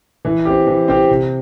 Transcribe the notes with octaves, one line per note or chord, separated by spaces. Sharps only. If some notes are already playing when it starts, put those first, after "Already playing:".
E3
C4 G4
E3
C4 G4
C3